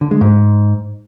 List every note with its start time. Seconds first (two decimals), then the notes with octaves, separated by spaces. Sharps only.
0.01 D3
0.11 G#3
0.21 G#2